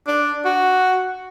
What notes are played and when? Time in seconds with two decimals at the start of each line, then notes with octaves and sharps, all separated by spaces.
0.07 D4
0.45 F#4